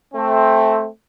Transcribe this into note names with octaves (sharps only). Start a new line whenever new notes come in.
A3 C4